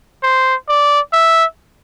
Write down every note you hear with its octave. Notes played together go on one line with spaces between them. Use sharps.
C5
D5
E5